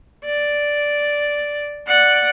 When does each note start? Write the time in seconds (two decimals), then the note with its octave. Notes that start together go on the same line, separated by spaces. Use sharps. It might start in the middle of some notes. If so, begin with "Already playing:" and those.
0.25 D5
1.87 D5 F#5